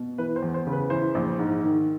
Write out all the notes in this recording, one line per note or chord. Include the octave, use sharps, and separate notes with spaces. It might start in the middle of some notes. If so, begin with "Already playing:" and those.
Already playing: B2
E3 B4
C5
E2
C5
C#3
B4
E3 C5
A#1
G#2
D#3